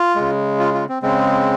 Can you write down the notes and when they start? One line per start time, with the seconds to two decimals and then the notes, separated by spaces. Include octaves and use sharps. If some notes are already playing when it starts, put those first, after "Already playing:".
Already playing: F4
0.16 C#3 G#3
0.60 F4
0.74 F4
0.89 C4
1.03 C#3 G#3 C4